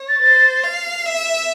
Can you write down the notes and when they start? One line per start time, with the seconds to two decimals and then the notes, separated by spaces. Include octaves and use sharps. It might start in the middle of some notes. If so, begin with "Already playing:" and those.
Already playing: C#5
0.09 A6
0.22 C5
0.64 F5
1.06 E5